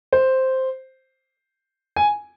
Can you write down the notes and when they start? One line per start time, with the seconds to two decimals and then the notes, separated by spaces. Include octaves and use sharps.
0.13 C5
1.96 G#5